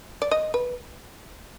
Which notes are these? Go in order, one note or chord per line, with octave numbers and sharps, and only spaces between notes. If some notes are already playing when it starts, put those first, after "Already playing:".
D5
D#5
B4